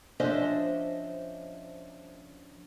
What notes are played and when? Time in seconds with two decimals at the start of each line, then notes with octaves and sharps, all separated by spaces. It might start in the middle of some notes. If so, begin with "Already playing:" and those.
0.20 F3 C#4 D4 C5 D#5 E5